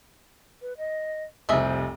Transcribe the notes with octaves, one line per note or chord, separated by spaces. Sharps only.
B4
D#5
F1 C2 G#4 C5 D#5 E5